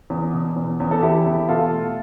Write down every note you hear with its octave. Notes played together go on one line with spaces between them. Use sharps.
E2
B2
E2
E2
A4
E2 E4 G4
E2
B2 F4 A4
A3